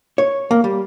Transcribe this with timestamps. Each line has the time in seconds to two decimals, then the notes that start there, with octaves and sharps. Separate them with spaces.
0.18 C#5
0.51 A#3
0.64 G3